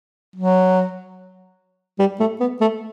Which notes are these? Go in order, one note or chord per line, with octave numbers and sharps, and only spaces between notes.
F#3
G3
A3
B3
A3